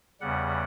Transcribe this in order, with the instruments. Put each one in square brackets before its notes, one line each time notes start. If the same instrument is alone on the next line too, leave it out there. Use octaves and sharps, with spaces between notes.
[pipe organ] E2 C#3 G3 F#5